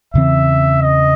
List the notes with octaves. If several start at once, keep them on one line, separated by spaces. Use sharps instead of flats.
E2 C#3 E3 C4 E5
D#5